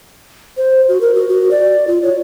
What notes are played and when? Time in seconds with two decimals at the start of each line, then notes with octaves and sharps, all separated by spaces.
0.57 C5
0.89 F#4
1.01 A#4
1.15 F#4
1.29 F#4
1.51 D5
1.87 F4
2.03 C#5